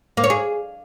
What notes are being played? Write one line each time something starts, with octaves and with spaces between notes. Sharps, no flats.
A#3
C#5
G#4